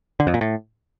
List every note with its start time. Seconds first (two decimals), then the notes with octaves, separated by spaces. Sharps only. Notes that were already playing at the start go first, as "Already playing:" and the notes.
0.20 D3
0.27 F2
0.34 A#2
0.41 A2